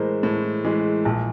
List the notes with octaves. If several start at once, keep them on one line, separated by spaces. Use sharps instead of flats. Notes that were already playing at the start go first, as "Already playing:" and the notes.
Already playing: A2 E3 G#3 A#4 C5
A2
E3 G#3
A#1